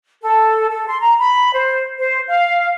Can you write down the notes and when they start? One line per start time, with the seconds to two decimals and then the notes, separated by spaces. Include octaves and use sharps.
0.22 A4
0.69 A4
0.87 C6
0.99 A#5
1.17 B5
1.53 C5
1.98 C5
2.27 F5